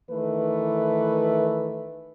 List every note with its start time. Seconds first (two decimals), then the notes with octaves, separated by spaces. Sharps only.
0.11 D#3 E3 A3 B4